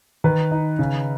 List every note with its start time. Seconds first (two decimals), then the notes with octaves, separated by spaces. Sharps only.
0.24 D#3 B4
0.51 D#4
0.79 C#3